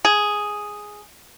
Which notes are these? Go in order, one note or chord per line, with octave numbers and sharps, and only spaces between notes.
G#4